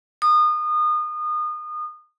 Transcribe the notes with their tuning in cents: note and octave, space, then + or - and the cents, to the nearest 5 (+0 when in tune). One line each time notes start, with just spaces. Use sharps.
D#6 -30